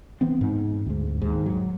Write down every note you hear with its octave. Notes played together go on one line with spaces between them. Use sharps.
E3 B3 C4
G#2
D2 G#2
D#2 G#2
F#3